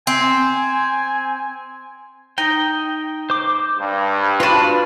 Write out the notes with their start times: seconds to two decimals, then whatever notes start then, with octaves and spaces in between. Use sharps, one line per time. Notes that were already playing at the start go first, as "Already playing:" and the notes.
0.07 C4 G#5
2.38 D#4 G5
3.30 C5 D6
3.78 G2
4.40 D4 F4 F#4 B4